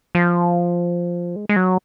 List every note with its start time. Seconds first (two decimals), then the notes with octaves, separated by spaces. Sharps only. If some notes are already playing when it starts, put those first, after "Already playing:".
0.15 F3
1.36 G#3
1.49 G#3
1.56 F#3